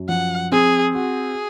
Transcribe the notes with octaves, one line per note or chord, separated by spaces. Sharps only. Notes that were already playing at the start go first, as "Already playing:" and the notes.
Already playing: F#2
F3 F#5
C4 G#4
F#4 G#4